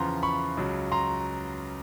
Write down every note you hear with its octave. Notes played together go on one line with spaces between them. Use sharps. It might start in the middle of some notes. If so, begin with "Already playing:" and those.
Already playing: E2 C#3 F3 A#5 C6
B5 C#6
C#2 C#3 F#3
A#5 C6